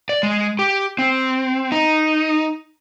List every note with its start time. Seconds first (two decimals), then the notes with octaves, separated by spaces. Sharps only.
0.09 D5
0.23 G#3
0.59 G4
0.99 C4
1.72 D#4